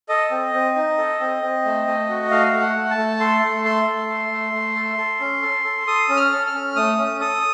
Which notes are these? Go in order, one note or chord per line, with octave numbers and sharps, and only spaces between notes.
A4 D#5
C4
C4
D#4
A4
C4
C4
A3
A3
F#4
A3 F5
A3
F#5
A3
A5
A3
A4 C6
A3
A4 C6
A3
A4
A3
A3
A4
A4
C#4
A4
A4
A4 D#6
C#4
F6
A4
F6
C#4
A3 D#6
C#4
A4 D#6